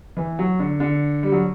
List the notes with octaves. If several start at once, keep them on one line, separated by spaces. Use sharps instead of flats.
E3
F#3
D3
D3
G3
F#3